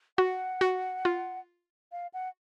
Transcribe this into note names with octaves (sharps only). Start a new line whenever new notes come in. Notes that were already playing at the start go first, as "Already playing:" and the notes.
F#4 F#5
F#4
F4
F5
F#5